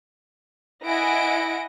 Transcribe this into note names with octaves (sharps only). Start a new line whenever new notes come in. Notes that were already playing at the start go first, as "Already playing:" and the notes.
E4 D#5 F#5 G#5 A#6 D7